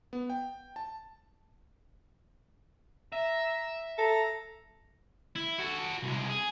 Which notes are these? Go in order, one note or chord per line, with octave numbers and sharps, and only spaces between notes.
B3
G5
A5
E5 A#5
A4 A#5
E4
F#4 A4
C2 G#3
G#4